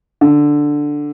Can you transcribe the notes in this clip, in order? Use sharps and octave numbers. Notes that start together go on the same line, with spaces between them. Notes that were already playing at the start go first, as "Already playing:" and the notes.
D3